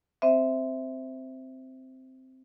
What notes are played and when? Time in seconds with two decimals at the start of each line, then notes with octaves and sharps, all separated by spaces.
0.22 C4 C5 E5